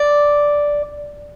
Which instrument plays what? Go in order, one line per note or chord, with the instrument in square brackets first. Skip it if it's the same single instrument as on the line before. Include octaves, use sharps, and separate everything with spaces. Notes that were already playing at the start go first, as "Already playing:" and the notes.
Already playing: [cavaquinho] D5